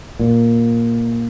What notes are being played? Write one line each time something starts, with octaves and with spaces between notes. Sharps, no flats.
A#2